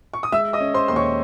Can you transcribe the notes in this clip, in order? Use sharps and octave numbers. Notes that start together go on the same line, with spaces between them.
C#6
D#6
G#3 E5 E6
D#5 D#6
C#4
C5 C6
D#2 C6
C#5 C#6